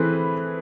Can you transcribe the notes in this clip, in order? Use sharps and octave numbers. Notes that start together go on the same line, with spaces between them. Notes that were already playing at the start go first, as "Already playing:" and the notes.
Already playing: E3 A3 C4 G#4 B4